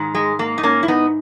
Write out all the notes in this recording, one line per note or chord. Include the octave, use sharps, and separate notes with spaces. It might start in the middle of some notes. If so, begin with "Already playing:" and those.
Already playing: G#2 D#3
G#3
A#3
D#4
A#3 C#4
E4
B3 D#4